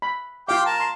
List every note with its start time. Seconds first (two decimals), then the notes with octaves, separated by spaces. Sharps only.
0.02 B5
0.48 F4 G4 F5 G5 D6
0.66 A#4 A5
0.80 C6